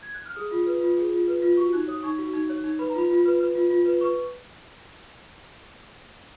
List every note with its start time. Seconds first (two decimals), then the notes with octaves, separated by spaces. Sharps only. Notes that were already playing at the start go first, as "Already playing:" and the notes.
0.03 G#6
0.14 F#6
0.25 F6
0.36 G#4 D#6
0.51 F4
0.66 B4
0.81 F4
0.97 G#4
1.13 F4
1.27 B4
1.42 F4
1.57 F#4 C#6
1.73 D#4 F#6
1.88 C#5 D#6
2.03 D#4 C#6
2.18 F#4
2.33 D#4
2.49 C#5
2.64 D#4
2.79 B4 B5
2.90 A#5
2.95 F4 B5
3.10 F4
3.26 B4
3.41 B4
3.55 F4
3.70 F4
3.86 B4
4.01 B4 C#6